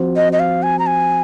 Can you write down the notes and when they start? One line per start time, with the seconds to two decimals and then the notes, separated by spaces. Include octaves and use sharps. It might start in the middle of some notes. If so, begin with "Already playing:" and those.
Already playing: F3 C4 F#4 C5
0.16 D#5
0.33 D#5
0.40 F5
0.63 G#5
0.79 A#5
0.87 G#5